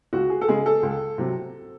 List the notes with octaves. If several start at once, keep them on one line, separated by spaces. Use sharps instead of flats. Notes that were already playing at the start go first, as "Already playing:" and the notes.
C#2 F#4
G#4
A4
C#3 G#3 G#4
A4
C#2
C3 F#3